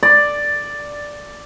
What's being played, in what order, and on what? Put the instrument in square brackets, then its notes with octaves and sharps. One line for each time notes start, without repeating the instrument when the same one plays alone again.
[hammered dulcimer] D5